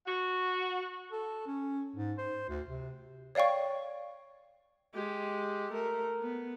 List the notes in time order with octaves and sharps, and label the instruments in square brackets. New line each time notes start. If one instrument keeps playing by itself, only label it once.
[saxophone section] F#4
[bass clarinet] A4
C#4
G#2
C5
D2
C3
[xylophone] C#5 D5 F5 G5 C#6
[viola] G#3 G4
A3 A#4
B3